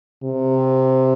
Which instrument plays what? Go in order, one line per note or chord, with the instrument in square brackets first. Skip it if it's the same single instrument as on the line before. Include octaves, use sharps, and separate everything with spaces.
[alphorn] C3